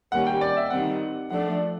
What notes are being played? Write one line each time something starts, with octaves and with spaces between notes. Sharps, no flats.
D#3 G3 A#3 C#4 F#5
G5
D5
E5
D#3 G3 C4 F#5
F3 A3 D4 F#5